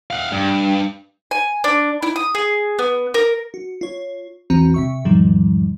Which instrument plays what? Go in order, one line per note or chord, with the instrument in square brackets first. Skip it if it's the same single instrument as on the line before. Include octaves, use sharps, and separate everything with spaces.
[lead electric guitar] F5 F#5
G2
[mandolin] G#5
D4
E4
D#6
G#4
B3
A#4
[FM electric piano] F#4
F4 C#5
A#1 E2 E3 C4 F#4 A#5
C3 E5 C#6
E2 G#2 B2 D#3 F3 G3